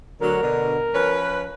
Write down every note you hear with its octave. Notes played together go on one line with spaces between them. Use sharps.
D2 D3 F#3 A#4
B2 D3
F3 C#4 B4